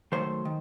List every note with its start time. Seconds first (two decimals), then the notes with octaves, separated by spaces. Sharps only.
0.12 D#3 F#3 A3 C5
0.45 D#3